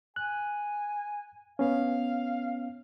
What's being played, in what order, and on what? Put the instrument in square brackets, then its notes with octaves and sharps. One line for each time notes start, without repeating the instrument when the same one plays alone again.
[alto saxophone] G#5 [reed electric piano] F#6
[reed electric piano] B3 C#4 [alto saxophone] F5